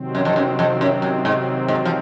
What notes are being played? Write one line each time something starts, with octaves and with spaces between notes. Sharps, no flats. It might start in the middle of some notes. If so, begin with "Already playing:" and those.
Already playing: C3 D#3 F#3 C4
F#2
F2
F#2
F2
F#2
F#2
G#2
G#2
F3